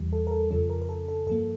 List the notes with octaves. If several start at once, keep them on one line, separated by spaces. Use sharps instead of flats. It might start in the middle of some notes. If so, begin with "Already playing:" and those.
Already playing: E2 E3 G3
A4
A#4
A4
F2 C#3 F3 C#4 A4
A#4
A#4
A4
A4
G2 F3 A#3 A4